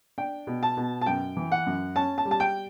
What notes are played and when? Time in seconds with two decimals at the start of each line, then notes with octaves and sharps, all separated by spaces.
0.18 D4 G5
0.47 B2
0.63 A5
0.77 B2
1.01 A5
1.06 F#2 G5
1.37 E3
1.52 F#5
1.66 F#2
1.96 C#4 A5
2.18 A5
2.25 G3
2.31 A5
2.40 G5